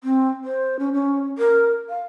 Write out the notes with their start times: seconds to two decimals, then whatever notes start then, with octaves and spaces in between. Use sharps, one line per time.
0.04 C4
0.45 C5
0.79 C#4
0.93 C#4
1.38 A#4
1.89 F5